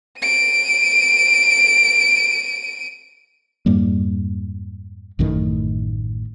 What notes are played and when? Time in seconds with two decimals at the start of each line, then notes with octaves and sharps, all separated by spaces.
0.18 D7 D#7
3.66 F2 G#2 G3 A#3
5.19 A1 F#2 A2 D#3